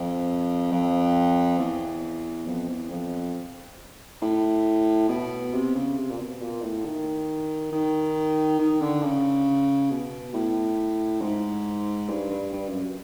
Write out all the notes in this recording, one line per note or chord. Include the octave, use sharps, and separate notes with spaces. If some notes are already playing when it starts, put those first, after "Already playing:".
Already playing: F2
F2
E2
F2
E2
F2
A2
B2
C3
C#3
C3
A#2
B2
A#2
A2
D#3
D#3
D#3
D3
C#3
B2
A2
G#2
G2
G2
G2
F#2